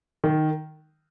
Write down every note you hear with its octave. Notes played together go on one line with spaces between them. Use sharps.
D#3